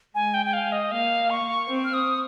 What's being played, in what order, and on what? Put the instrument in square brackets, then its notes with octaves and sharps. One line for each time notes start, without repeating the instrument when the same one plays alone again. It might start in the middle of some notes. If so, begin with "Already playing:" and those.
[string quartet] G#3 [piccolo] G#5
[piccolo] G5
G5
F5
D#5
[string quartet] A#3 [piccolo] F5
[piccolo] C#6
[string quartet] C4
[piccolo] F6
D#6